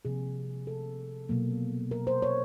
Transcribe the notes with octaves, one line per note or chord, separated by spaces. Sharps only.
C3 F3 A#3 G#4
A4
B2 F#3 A#3
A#4
C5
C#5